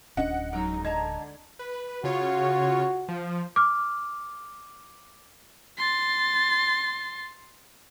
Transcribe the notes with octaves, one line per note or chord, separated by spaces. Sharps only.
D1 C#4 D4 D#5 F#5
F#3 G#3 D#4 A#4 A#5 E6
D3 D#5 A5 A#5 G#6
B4
C#3 F4 F#4 C#5
F3
D6 F6
C6 A6